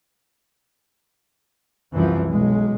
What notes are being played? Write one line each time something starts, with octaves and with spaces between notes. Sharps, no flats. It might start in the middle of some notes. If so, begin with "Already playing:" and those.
C2 F#2 E3 F3
B1 G#3